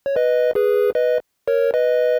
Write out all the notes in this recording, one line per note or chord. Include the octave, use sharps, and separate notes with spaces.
C#5
B4 D#5
G#4 B4
B4 D#5
A#4 C#5
B4 D#5